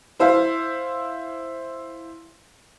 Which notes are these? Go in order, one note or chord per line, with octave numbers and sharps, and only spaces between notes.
E4 C5 E5 F5